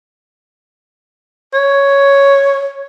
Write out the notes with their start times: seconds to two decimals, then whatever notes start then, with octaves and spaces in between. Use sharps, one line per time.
1.53 C#5